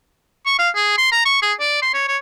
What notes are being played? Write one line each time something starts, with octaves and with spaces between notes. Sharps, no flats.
C#6
F5
G#4
C6
A#5
C#6
G#4
D5
C6
C#5
C#5